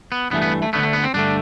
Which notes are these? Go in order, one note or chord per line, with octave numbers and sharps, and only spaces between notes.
B3
G2 E3 A3 B3
B3
A3
D2 D3 A3 B3
A3
B3
C4
G2 D3 A3 D4